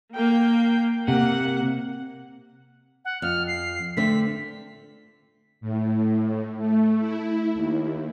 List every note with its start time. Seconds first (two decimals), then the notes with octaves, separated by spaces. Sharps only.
0.14 A#3 G5
1.08 C3 A#3 F#5
3.05 F#5
3.22 F2 F6
3.47 C7
3.97 D3 A3 C4 B6
5.61 A2
6.58 A3
7.00 E4
7.54 D#2